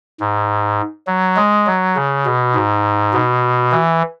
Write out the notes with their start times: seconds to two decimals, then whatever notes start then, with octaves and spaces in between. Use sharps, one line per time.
0.20 G#2
1.07 F#3
1.36 G#3
1.67 F#3
1.96 C#3
2.26 B2
2.55 G#2
3.13 B2
3.72 E3